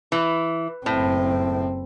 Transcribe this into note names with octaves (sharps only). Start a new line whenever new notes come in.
E3
F#1 A2 C4